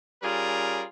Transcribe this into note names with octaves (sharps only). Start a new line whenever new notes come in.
G3 C#4 F4 G#4 A#4